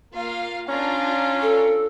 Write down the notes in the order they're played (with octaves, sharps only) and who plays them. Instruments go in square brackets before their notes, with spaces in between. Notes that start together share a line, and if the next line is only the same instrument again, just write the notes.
[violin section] A#3 F4 F5
[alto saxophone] C#4 [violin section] D4 F4 A#5
[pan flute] A4